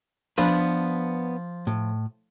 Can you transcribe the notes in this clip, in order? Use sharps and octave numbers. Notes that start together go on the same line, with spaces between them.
F3 B3 D4 B4
A2